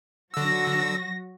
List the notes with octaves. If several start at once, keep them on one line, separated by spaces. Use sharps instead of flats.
D3 F#3 F#4 E6 A#6